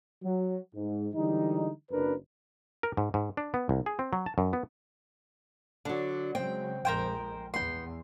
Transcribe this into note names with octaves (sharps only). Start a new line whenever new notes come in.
F#3
G#2
D3 E3 G3 G#3 D#4
F#1 F#2 D4 A#4 B4
A#4
G#2
G#2
D4
B3
C2
G#4
C4
F#3
A5
F#2
B3
D3 F#3 D4
C#3 F#3 G#3 C4 G5
A#1 F2 G#3 A#4 C5 G5
E2 B3 G5 C6